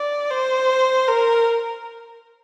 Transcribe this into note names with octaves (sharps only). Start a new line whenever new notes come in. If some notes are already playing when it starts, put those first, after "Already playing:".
Already playing: D5
C5
A#4